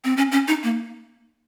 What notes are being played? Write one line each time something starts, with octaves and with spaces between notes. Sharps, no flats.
C4
C#4
C#4
D#4
A#3